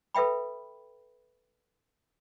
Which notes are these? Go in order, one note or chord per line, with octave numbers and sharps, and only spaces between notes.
A4 B4 E5 G5 B5